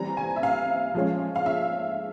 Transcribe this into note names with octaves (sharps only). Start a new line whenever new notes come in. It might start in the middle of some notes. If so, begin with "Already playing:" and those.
Already playing: E3 G3 C4 A#5
G#5
E5
F5
F3 G#3 C#4
F5
E5